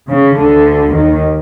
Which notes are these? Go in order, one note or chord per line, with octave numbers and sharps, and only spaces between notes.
C#3
D2 D3
D#2 D#3